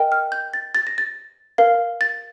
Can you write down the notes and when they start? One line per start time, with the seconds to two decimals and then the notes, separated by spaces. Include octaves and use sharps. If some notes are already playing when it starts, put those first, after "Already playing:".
Already playing: A#4 D#5 G5
0.12 F6
0.32 G6
0.54 A6
0.75 A6
0.87 A#6
0.98 A6
1.58 A#4 F5
2.01 A6